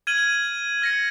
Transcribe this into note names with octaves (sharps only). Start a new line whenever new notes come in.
F6 G#6 D#7 F#7
F6 A#6 C#7